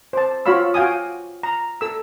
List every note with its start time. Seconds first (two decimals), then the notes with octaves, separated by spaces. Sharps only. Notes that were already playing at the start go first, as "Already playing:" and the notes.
0.13 C5 A5
0.46 F4 F#4 C#5 F5 B5 E6
0.74 F#4 F5 G5 G#5 D#6
1.43 A#5
1.81 A4 E6